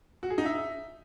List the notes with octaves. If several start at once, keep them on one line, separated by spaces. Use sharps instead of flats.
F#4
G#4
D#4
E5